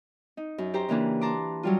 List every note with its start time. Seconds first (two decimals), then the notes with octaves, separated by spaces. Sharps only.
0.37 D#4
0.58 F#2
0.74 G4 C5 A#5
0.89 C#3 E3 A#3 D4
1.21 A5 A#5 C6 D6
1.63 F#3 G3 F4